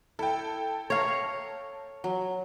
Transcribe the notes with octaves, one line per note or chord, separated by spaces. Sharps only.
E4 A4 G5
C#5 F5 A#5
F#3